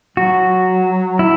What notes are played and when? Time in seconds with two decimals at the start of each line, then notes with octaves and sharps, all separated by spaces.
0.17 F#3 F#4
1.19 E4